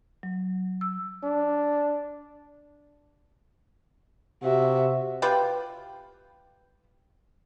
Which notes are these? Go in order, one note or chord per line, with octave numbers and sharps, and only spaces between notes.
F#3
E6
D4
C3 F#4 E5
F4 G4 B4 G5